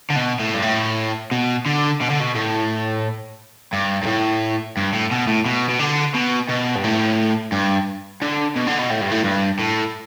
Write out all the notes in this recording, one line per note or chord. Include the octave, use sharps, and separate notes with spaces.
D3
B2
A2
G2
A2
B2
D3
B2
D3
B2
A2
G2
G2
A2
G2
A2
B2
A2
B2
B2
D3
B2
B2
G2
A2
G2
D3
B2
D3
B2
A2
G2
A2
G2
A2